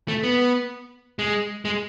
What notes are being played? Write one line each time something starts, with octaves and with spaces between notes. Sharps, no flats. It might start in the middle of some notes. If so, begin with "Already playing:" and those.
A3
B3
G#3
G#3